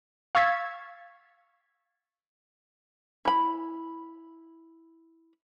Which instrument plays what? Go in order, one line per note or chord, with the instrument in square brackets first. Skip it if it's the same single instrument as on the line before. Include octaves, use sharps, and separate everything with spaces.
[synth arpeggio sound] F5 C#6 E6 G#6 A6 B6
[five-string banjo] E4 B5